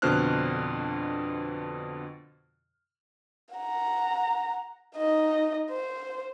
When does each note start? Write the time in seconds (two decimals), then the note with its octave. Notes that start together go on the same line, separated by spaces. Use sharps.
0.02 F2 B2 D3 C5 F6 F#6
3.55 F#5 A#5
4.97 D#4 D#5
5.70 C5